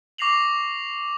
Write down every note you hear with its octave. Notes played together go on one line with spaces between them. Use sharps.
C#6 D6 A#6 C7 F7 F#7